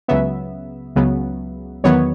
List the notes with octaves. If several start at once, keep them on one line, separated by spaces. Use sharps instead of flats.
C#2 C#3 F#3 B3 E5
C#2 C#3 F#3 B3
E2 D#3 F#3 B3 C#5